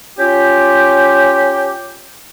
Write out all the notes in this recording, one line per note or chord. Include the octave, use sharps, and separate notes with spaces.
C#4 F4 G4